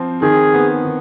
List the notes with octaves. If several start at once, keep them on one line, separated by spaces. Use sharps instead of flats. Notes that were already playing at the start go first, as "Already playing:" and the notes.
Already playing: F3 C4
D#3 G#4
B3
D#3